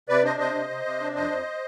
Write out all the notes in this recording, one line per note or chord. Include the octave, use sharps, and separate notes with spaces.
C3 B4 D5
D4 C5 D#5
C3 C5 D#5
C3
C3
C3
D4
F2 C5 D#5
F2